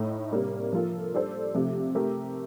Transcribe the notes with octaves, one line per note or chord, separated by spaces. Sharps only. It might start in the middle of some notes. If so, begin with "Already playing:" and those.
Already playing: A2 A3 D#4
C3 G3 A#3 D4
F3 A#3 F4 A4
G3 D4 A4 C5
C3 F3 A3
A3 C4 G4 A#4